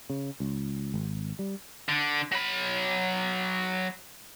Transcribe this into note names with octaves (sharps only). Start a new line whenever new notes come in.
C#3
C#2
G#1
G3
D3
F#3 B5